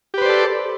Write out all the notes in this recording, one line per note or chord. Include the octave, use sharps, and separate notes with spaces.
G4 A4 B4 C5 D5